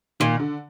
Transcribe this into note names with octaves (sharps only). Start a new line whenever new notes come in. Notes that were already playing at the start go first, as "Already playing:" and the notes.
A#2 D#3
D3